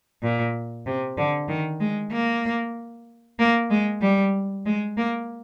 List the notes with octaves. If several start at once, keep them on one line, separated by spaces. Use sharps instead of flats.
A#2
C3
D3
D#3
G#3
A#3
A#3
G#3
G3
G#3
A#3